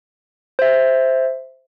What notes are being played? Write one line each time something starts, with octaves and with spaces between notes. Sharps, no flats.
C5 E5